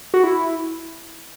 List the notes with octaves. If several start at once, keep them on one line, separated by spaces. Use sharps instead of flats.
F#4
E4